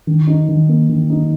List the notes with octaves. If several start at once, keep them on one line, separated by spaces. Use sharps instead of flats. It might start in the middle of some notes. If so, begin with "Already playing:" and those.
D#3
D#4
D#3
A#3
D#3
D#4